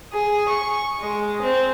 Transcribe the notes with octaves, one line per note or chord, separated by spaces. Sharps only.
G#4
C#6
G#3
C4